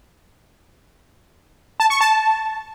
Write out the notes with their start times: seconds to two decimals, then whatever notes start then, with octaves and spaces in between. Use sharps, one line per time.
1.80 A5
1.90 C#6
2.01 A5